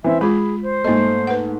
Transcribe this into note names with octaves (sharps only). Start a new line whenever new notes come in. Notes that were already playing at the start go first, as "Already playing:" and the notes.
E3 C4 E5
G#3 F4 G#4 B5
C5
G#2 A3 A#3 D#5
B4 F#5